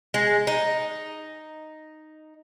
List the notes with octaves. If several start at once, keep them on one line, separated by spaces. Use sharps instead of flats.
G#3
D#4